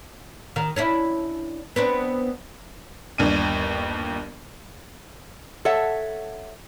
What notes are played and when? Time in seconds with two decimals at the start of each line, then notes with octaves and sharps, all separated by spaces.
0.56 D#3
0.76 C#4 D4 E4
1.76 B3 C4 D4
3.18 G1 D#2 D4 D#7
5.65 A4 C#5 E5 F#5